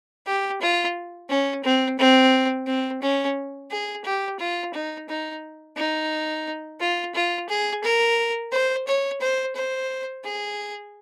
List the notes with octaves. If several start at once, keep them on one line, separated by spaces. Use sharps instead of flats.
G4
F4
C#4
C4
C4
C4
C#4
G#4
G4
F4
D#4
D#4
D#4
F4
F4
G#4
A#4
C5
C#5
C5
C5
G#4